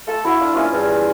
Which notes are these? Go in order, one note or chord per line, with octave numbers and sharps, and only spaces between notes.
A3 F4 A4
E4 F#4
A3 D4 F4
A#3 C#4 D4 E4 F4 D#5
E2 G2